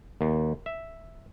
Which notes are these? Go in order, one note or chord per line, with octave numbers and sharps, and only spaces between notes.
D#2
E5